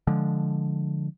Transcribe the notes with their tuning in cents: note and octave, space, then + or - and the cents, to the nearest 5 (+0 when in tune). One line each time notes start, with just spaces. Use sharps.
D3 +0 F3 +0 G#3 +5